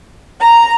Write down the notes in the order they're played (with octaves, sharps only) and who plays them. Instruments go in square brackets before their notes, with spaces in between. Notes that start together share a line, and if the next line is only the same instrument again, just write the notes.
[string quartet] A#5